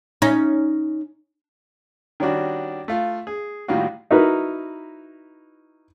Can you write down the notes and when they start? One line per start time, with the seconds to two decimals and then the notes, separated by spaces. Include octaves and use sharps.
0.22 C#4 D#4
2.20 D#3 G3 C#4 D4 F#4
2.88 A3 F4
3.27 G#4
3.68 A2 D#3 G3 A#3 F4 F#4
4.11 D#4 E4 F#4 A#4 B4